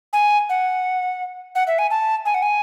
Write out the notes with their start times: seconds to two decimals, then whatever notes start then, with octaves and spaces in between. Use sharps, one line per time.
0.13 G#5
0.49 F#5
1.55 F#5
1.67 E5
1.79 G#5
1.90 A5
2.25 G#5
2.34 F#5
2.42 G#5